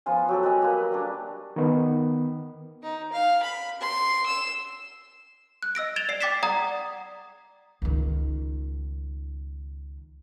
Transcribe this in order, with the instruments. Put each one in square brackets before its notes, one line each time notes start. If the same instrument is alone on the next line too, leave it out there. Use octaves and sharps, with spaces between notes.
[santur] F3 B3 F4 G#5
F#3 G4 A4
B4 D#5 G#5
A#3 B4
G3 D4
[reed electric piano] D#3 B3
[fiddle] D#4
F5
B5
C6
E6
[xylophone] F#6
D#5 E6 A#6 D7
G#6 A6 D7 E7 F7 G7
D5 C7
G5 D6 A6 B6 C7 E7
D5 F#5 A#5 D#6 G#6
[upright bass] C#2 D#3